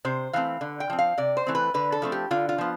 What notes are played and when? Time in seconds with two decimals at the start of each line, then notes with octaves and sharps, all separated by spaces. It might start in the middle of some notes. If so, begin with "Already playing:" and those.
0.05 C3 C5
0.33 E3 A3 C4 F5
0.61 D3
0.80 G5
0.90 F3 C4
0.99 F5
1.18 C3 D5
1.37 C5
1.47 E3 A3 C4
1.55 B4
1.74 D3 B4
1.92 A4
2.02 F3 A3 C4
2.12 G4
2.31 D3 F4
2.49 F4
2.58 F3 B3